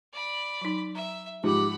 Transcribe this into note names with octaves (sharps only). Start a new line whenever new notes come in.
D5 B5
F#3 D#4
E5 A#5
G#2 F3 G4 F#5 B5